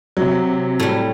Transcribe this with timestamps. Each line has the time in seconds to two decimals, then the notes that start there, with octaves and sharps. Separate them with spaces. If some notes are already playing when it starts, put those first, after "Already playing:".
0.17 C3 F#3
0.80 A2 G3